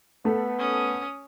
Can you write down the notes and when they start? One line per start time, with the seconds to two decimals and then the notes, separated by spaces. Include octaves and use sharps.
0.25 A3 B3 A4
0.59 C#4 D#6